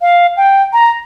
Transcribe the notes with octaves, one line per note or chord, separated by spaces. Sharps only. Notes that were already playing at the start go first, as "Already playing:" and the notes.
F5
G5
A#5